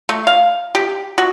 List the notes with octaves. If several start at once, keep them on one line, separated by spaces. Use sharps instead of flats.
A3
F5
G4
F#4